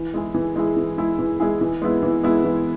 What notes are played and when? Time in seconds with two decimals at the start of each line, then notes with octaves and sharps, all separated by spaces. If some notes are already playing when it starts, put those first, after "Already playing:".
Already playing: E3
0.14 G#3 E4 G#4
0.34 E3
0.56 G#3 E4 G#4
0.76 E3
0.97 G#3 E4 G#4
1.19 E3
1.40 G#3 E4 G#4
1.61 E3
1.82 G#3 B3 E4
2.03 E3
2.23 G#3 B3 E4
2.45 E3